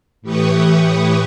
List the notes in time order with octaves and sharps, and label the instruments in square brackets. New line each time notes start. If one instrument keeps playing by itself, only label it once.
[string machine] A2 E3 G4 B4 C#6 D#6